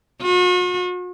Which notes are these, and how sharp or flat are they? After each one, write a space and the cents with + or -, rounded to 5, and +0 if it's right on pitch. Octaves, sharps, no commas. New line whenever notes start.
F#4 -45